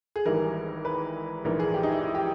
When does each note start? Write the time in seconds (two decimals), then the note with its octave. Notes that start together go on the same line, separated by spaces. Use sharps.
0.16 G#4
0.26 G#1 G#2 E3 G3 A#4
0.85 B4
1.44 A#1 G#2 E3 A#4
1.60 G#4
1.74 G4
1.83 D#4
1.90 E4
2.04 E4
2.15 G4